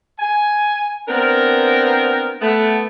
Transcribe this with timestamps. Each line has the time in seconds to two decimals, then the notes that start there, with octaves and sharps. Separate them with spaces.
0.20 G#5
1.08 B3 C4 D4 A#4
2.41 A3 B3